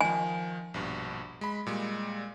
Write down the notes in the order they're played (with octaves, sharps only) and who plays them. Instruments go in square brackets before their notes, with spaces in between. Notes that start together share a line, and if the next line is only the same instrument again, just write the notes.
[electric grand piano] D#3 F3 [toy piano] G#5
[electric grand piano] A#1 G2 B2
G#3 B5
A#2 G3 G#3